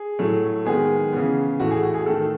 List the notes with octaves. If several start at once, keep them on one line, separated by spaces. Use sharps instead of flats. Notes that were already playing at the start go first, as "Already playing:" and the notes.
Already playing: G#4
A2 F#3 A3
D#3 G#3 B3 G#4
C#3 E3 B3
A2 E3 A3 F#4
G#4
F#4
G#4
D#3 A3 A4